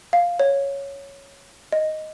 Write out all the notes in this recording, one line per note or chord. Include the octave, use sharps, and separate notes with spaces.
F5
C#5
D#5